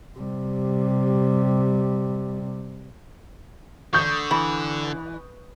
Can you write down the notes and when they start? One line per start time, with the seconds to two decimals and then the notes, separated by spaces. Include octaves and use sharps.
0.19 C3 G3
3.93 D3 C#6 D#6 G6
4.31 E3 B5